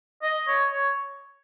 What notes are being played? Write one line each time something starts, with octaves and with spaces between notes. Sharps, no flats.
D#5
C#5
C#5